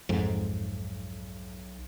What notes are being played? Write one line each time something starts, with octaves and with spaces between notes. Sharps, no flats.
B1 F2 G#2